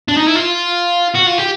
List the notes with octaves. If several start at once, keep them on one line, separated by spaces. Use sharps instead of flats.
D4
D#4
E4
F4
F#4
F4
G4